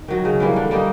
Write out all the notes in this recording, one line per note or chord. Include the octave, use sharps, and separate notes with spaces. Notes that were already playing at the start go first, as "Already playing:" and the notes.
Already playing: D#4
D#3 F#3
C#3
E3 G3 A#3
D3
G3 A#3 D#4